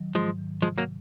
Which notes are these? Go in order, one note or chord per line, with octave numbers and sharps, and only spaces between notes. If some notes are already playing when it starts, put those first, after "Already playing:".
Already playing: D#3 F#3
G#2 F3 G#3
D#3
C3 F3 G#3
F#3 A#3